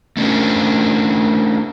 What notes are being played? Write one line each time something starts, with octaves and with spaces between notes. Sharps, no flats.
A3 C#4 D4 A#4